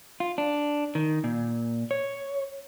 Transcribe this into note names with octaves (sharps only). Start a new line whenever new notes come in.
F4
D4
D#3
A#2
C#5